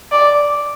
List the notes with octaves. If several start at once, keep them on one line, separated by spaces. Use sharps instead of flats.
D5